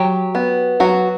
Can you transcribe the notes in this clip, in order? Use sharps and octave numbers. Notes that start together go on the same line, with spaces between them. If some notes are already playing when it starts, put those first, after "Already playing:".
Already playing: F#3 G4
B3
F#3 F#4